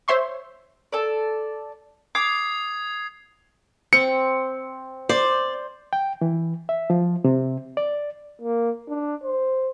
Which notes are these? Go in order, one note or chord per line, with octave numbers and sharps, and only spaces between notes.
C5 C#5 E5 C6 C#6
A4 D5
D6 D#6 G#6 C7
C4 C#7
C5 D5
G5
E3
E5
F3
C3
D5
A#3
D4
C5